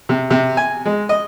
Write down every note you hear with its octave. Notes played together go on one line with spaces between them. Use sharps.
C3
C3
G#5
G#3
D#5